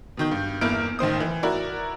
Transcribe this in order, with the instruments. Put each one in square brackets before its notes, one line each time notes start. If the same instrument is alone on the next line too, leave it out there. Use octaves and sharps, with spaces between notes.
[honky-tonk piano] B2 D#3 G6
G2
G1 E2 A#3 E4 F6 D7
A1 D#3 C5 D#6
E3
E4 F#4 A#4 D5